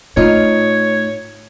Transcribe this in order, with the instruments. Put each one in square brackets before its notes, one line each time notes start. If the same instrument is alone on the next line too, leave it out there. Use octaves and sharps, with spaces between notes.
[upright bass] A2 [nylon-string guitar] D#4 F4 [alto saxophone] C#5